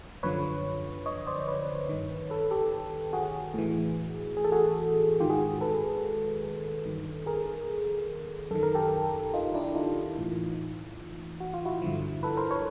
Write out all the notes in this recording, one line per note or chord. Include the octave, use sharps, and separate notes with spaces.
F#2 D3 F3 B4 C#5
C#5 D#5
C5 D5
B4 C#5
G2 D#3
A4 B4
G4 A4
F#4 G#4
A2 E3
G#4
A4
F#4 G#4
G#2 D#3 F4 G4
F#4 G#4
A4 B4
G2 D#3
G#4 A#4
F#2 D#3 A4
A#4
G4 A4
D#4 F4
D4 E4
D#4 F4
A2 E3
F#4
F4
E4 F#4
G2 D3 F3
A4 B4
A#4 C5
B4 C#5